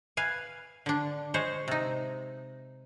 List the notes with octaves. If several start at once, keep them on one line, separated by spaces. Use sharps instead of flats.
B4 F5 G#5
D3 D4
G#3 C5 C#5
C3 D#4